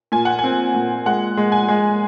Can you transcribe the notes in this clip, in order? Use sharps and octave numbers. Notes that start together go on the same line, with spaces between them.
A#2 G#5
F#5
C4 G#5
A#2
G#3 F#5
G#3
G#5
G#3